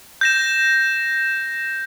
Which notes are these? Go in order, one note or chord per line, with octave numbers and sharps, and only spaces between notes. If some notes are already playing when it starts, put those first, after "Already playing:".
G6 A#6 E7